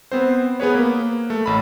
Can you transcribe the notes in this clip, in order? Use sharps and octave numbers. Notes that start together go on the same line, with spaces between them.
B3 C4 C5
B3 G#4 B4 C#5
A#3
A3
A1 B5